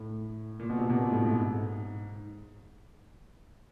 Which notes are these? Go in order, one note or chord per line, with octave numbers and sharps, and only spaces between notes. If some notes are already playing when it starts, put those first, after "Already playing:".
Already playing: A2
A#2
B2
C3
B2
A#2
A2
G#2